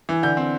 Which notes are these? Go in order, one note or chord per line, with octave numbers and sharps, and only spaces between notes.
E3
D3 G6
C4